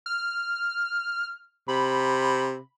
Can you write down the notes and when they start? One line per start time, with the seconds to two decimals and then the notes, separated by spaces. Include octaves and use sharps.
0.06 F6
1.68 C3 B5